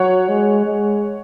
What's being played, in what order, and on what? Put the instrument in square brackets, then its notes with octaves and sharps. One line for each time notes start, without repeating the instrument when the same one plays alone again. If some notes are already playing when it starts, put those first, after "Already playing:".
Already playing: [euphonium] F#3 [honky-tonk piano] C#5 F#5
[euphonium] G#3
G#3